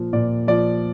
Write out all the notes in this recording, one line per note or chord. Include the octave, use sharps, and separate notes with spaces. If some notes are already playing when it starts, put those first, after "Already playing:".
Already playing: A#2 F3
A#2 D5
F3 D5